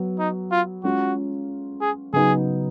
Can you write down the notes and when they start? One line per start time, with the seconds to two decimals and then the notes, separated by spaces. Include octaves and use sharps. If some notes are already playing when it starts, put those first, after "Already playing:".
Already playing: F#3 B3
0.19 D#4
0.51 F4
0.84 G#3 C#4 F4 F#4
1.81 G#4
2.13 C#3 F#3 B3 D#4 G#4